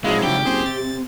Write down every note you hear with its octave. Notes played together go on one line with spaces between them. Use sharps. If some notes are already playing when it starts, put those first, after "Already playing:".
G#1 A#2 F3 F#3 G#3 E4 F5
C#3 D4 G4
F#1 C4 G#4 C5
C3 A6